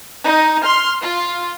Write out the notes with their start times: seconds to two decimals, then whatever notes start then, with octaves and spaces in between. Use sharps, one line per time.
0.25 D#4
0.62 C6 F6
1.02 F4